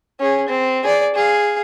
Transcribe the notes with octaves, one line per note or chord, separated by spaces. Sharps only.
C#4 G#4
C4
G#4 D5
G#4 F5